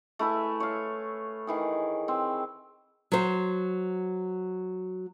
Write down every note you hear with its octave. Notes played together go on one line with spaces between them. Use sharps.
A3 E4 B4 G#5
C#5 F5
D#3 E3 G#4
C4
F#3 C5